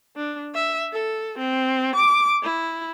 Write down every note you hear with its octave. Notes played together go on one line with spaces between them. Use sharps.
D4
E5
A4
C4
D6
E4